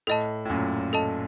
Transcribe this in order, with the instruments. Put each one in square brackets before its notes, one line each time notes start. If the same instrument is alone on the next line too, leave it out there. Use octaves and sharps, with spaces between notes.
[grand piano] A2 [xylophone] A4 D#5 A5
[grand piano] A2
F#2 A#2
[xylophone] A4 D#5 A5